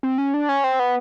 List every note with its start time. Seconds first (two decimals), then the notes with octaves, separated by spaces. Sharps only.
0.03 C4
0.18 C#4
0.34 D4
0.49 C#4
0.64 C4
0.79 B3